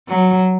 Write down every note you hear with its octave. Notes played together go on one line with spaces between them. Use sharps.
F#3